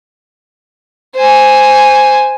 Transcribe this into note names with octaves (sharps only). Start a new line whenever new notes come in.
C5 G#5